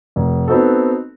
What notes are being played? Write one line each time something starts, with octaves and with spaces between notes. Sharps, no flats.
F1
B3 C4 D#4 F#4 A4